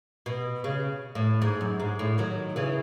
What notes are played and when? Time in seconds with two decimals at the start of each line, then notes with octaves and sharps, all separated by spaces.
0.26 B2
0.64 C#3
1.15 A2
1.42 G#2
1.61 F#2
1.80 G#2
1.99 A2
2.18 D#3 F#3
2.56 C#3 E3